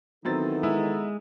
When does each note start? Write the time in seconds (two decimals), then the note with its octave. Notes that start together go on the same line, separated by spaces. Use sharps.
0.25 D#3 E3 F#3 B3 C4 D#4 A4 A6
0.63 G#3 E4